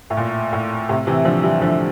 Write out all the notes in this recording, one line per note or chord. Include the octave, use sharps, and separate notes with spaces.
A2
A#2
A2
A2 C3
C3 E3
D3 F3
E3 G3
D3 F3